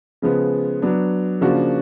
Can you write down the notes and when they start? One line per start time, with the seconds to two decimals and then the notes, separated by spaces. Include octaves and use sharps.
0.22 C#3 F3 G#3 B3
0.82 F#3 B3 D4
1.41 C#3 F3 A#3 D4 F#4